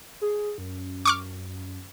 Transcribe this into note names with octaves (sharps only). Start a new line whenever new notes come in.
G#4
F#2
C#6 D6 F6